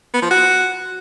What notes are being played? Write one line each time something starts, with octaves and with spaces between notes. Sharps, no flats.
B3
F3
F#4